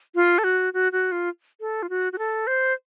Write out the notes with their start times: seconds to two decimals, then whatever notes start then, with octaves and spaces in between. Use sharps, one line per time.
0.15 F4
0.38 A4
0.44 F#4
0.74 F#4
0.92 F#4
1.12 F4
1.60 A4
1.83 F4
1.90 F#4
2.13 F#4
2.18 A4
2.47 C5